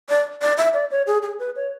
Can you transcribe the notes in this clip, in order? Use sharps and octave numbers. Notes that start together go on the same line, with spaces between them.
D5
D5
E5
D5
C#5
G#4
G#4
B4
C#5